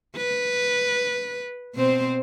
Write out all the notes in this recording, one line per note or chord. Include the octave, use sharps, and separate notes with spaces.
B4
B2 C4 C5